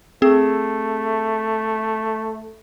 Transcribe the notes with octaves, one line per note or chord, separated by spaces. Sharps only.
A3 C4 G#4